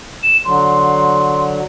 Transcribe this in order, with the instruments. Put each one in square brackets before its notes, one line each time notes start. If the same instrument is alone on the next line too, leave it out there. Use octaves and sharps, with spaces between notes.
[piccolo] E7
[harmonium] D3 F#3 [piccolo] C6